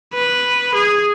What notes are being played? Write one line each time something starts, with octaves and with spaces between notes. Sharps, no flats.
B4
G#4